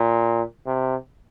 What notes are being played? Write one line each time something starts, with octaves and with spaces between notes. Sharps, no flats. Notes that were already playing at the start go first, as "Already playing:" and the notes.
Already playing: A#2
C3